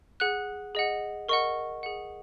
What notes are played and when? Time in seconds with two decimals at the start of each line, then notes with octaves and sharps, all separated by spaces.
0.20 G#4 F#5 F#6
0.75 G#4 D#5 F#5
1.29 A#4 D#5 F#5 C#6
1.83 G#4 F#5